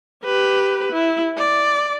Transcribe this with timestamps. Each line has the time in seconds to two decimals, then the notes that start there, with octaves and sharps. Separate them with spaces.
0.25 G4 B4
0.92 E4
1.38 D5